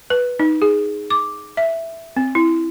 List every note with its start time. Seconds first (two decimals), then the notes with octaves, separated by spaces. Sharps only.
0.10 B4
0.39 D#4
0.62 G#4
1.10 D6
1.57 E5
2.16 C4
2.35 E4